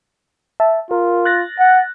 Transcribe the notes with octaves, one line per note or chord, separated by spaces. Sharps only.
E5 A5
F4 A#4
F#6 A6 A#6
F#5